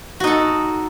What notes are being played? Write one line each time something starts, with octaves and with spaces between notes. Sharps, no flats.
D#4 F#4 A4